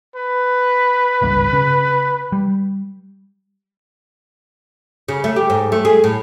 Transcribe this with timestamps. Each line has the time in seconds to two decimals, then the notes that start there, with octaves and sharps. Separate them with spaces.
0.16 B4
1.22 G#1 C#2 G2
1.53 C#3
2.32 G3
5.08 C#3
5.24 A3
5.36 G4
5.50 G#2
5.72 A3
5.85 G#4
6.04 A2